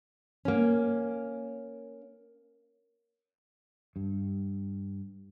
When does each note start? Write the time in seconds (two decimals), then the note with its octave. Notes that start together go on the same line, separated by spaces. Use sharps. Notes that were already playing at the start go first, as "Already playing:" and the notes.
0.45 A#3 C#4
3.96 G2